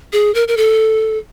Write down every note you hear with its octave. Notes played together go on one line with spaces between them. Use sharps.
G#4
A#4
A#4
A4